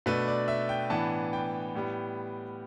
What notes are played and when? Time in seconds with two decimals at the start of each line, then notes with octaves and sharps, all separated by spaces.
0.06 B2 A3 D4 B4
0.28 D5
0.48 E5
0.69 G5
0.90 A2 E3 B3 D4 A5
1.33 G5
1.75 A2 G3 B3